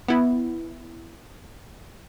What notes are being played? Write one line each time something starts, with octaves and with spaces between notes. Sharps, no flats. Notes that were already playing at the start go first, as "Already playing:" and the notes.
B3 E4